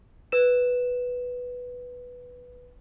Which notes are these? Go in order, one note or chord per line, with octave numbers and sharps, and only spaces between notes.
B4 E7